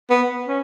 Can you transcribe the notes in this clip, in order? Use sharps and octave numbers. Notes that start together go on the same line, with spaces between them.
B3
C#4